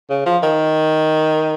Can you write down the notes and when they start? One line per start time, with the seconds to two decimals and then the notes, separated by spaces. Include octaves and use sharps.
0.10 C#3
0.26 F3
0.43 D#3